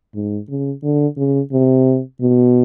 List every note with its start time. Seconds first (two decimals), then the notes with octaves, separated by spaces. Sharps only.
0.15 G#2
0.49 C#3
0.83 D3
1.17 C#3
1.52 C3
2.21 B2